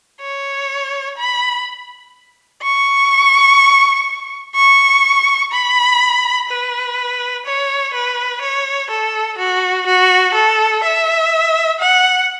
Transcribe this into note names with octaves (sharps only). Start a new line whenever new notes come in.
C#5
B5
C#6
C#6
B5
B4
C#5
B4
C#5
A4
F#4
F#4
A4
E5
F#5